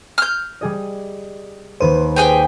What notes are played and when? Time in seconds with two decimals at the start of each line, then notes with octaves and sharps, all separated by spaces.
0.18 F6 G6
0.61 G3 G#4 D#5
1.80 D#2 A#3 B4 C5 D#7
2.16 G4 G#4 G5